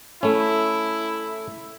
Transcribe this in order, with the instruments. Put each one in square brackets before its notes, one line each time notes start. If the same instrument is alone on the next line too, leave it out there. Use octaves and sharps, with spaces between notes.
[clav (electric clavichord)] A3 C#4 [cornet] E4